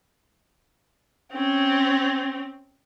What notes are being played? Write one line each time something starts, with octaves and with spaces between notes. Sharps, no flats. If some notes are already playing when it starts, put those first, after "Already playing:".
C4 C#4